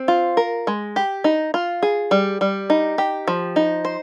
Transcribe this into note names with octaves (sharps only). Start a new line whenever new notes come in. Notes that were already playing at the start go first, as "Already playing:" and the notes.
Already playing: C4
F4
A#4
G#3
G4
D#4
F4
G#4
G3
G3
D#4
G4
F3
D#4
C5